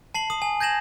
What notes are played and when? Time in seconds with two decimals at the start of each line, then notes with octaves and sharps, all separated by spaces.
0.14 A5 C7 F#7
0.30 D#6 F#7
0.42 G#5
0.60 G6 G#6 A#6 E7 F#7